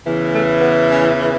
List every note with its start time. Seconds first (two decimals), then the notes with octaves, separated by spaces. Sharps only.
0.06 E2 C#3 E3
0.33 A3
0.60 B3
0.89 C#4